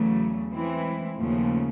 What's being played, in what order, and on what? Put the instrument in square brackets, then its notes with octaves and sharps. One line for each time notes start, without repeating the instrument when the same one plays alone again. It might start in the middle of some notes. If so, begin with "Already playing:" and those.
Already playing: [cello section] E2 C#3 F#3 A3
E3 G#3 C4 E4
D#2 C#3 F3 A3